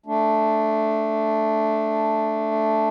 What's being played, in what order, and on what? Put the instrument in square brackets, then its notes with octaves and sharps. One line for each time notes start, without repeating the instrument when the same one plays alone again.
[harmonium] A3 D4